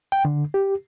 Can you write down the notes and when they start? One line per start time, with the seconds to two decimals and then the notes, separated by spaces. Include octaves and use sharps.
0.12 G5
0.25 D3
0.54 G4